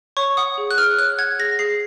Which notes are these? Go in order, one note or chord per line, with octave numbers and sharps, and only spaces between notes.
C#5 C#6
F#5 D#6
G#4
F#6
G#4 F6
C#5 F#6
F#5 G#6
G#4 A#6
G#4 C7